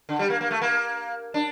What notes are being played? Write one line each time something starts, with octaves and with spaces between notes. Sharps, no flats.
D3
G3
A#3
A#3
A3
A#3
D4